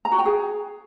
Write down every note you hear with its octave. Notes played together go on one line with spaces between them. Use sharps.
A#5
F#4
G5
G#4